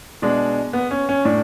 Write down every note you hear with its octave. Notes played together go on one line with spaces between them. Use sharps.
B2 G#3 D4
B3
C#4
C#4
A2 D4